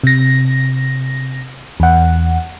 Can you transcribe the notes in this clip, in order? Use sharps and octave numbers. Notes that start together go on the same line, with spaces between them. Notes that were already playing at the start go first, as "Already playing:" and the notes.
C3 A#6
E2 F#5